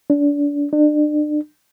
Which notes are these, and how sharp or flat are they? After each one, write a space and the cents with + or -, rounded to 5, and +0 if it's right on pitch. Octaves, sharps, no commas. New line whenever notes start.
D4 -30
D4 +35